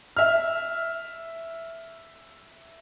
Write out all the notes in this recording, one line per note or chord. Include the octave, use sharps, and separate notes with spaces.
E5 F6